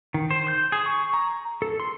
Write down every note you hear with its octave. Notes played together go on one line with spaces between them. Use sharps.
D#3
C5
G6
G#4
C#6
A#5
A4
C6